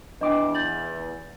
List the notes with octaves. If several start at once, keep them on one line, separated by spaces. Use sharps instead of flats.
E2 D4 D#5 G5 D6
G6 A6 F#7